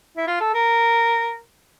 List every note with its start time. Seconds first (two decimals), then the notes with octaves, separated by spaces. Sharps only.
0.17 E4
0.27 F4
0.40 A4
0.54 A#4